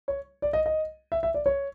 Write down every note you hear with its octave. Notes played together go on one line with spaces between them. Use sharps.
C#5
D5
D#5
D#5
E5
E5
D5
C#5